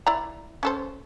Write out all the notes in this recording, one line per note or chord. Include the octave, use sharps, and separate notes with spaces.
E4 D5 A#5
C#4 A4 C5